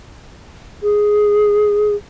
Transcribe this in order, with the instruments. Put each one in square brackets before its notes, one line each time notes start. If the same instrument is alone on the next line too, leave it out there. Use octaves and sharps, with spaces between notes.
[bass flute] G#4